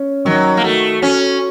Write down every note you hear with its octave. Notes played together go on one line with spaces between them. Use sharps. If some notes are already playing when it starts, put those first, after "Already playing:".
Already playing: C#4
D#3 F#3
A#3
A3 F#4
C#4 F#4